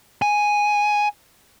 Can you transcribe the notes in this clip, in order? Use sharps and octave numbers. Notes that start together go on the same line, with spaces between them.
G#5